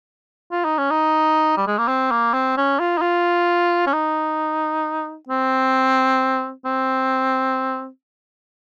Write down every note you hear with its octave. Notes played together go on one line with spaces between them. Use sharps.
F4
D#4
C#4
D#4
G3
G#3
A#3
C4
A#3
C4
C#4
F4
D#4
F4
C#4
D#4
C4
C4